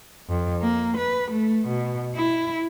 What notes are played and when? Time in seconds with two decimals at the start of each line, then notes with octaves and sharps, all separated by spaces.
0.29 F2
0.62 A#3
0.98 B4
1.31 A3
1.68 B2
2.15 E4